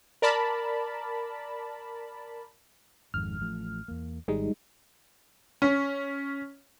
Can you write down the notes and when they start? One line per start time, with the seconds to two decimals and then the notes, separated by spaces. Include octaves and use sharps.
0.22 A#4 D5 A5 B5
3.14 G#1 F2 G#2 F6
3.41 A1 F3 A3
3.88 E2 A#3
4.28 G#1 G3 G#3 D#4
5.62 C#4